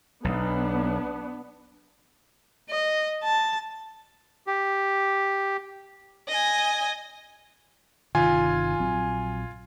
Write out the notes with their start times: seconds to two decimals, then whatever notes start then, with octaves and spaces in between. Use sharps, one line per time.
0.24 B1 B3 D4
2.70 D#5
3.24 A5
4.47 G4
6.29 D#5 G#5
8.15 G1 C3 D#3 F4 G#5
8.80 A#1 F#3 C4